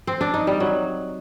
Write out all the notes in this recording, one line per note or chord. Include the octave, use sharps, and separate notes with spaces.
C4
D4
D#4
G3
F#3